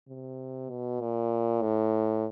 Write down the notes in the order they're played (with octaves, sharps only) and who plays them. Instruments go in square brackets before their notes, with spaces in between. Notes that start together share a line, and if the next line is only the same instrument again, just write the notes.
[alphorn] C3
B2
A#2
A2